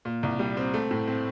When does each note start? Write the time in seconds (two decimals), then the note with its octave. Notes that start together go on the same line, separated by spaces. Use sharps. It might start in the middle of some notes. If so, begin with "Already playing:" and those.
0.05 A#2
0.23 C2
0.39 G3
0.57 C4
0.74 A3
0.91 A2
1.08 C4